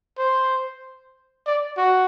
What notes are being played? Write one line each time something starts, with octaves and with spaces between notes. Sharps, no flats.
C5
D5
F#4